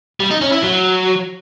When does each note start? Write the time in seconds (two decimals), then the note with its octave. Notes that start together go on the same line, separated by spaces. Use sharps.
0.20 G3
0.31 D#4
0.41 C#4
0.52 E4
0.63 F#3